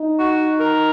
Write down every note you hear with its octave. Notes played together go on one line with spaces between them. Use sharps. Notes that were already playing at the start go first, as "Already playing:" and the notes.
Already playing: D#4
F#4
A#4